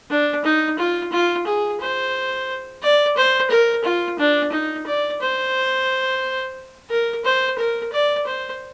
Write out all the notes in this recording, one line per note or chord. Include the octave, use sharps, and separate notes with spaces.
D4
D#4
F4
F4
G#4
C5
D5
C5
A#4
F4
D4
D#4
D5
C5
A#4
C5
A#4
D5
C5